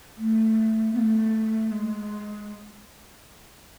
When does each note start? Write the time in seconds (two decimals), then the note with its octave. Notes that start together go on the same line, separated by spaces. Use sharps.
0.17 A3
0.94 B3
0.99 A3
1.71 G#3